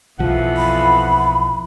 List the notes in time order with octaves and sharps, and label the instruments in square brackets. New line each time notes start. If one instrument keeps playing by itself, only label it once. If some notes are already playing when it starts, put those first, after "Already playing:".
[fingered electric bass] B1 F3 [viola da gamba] F2 E3 B3 [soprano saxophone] F#5
[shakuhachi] B5